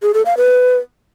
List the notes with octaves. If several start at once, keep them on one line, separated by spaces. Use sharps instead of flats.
G#4
A4
F5
B4